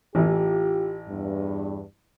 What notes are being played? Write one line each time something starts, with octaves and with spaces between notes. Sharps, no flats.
A1 E3 F4 G4
E2 G2